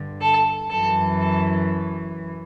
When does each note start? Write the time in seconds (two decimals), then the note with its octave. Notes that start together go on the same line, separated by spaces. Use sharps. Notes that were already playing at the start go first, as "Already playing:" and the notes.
Already playing: G2 D3
0.21 A4
0.70 F#2 E3 A4
1.21 A4